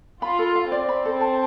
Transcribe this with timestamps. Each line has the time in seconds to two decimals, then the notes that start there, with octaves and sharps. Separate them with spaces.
0.22 F4 B5
0.39 A4
0.55 F5
0.72 C4 D5
0.89 B5
1.05 A4
1.21 A5